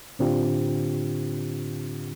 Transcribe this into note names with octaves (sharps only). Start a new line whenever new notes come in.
A2 D3 C4 D4 F4 G4